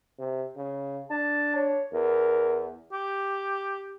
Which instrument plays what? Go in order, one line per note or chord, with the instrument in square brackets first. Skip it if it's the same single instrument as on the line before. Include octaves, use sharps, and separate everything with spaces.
[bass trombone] C3
C#3
[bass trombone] D4 [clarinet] A5
[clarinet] C#5
[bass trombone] E2 [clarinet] A#4
[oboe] G4